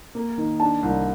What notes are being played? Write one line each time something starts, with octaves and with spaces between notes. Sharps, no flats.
A#3
D#3
D4 A5
C2